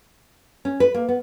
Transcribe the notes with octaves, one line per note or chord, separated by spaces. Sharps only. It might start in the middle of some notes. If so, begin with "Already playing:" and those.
C#4
B4
A#3
B3